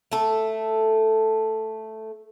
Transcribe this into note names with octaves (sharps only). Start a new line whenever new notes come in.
A3 A4